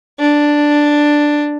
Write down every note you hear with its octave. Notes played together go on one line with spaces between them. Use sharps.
D4